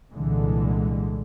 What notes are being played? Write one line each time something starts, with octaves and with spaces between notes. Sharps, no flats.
C2 A#2 D3 E3 G#3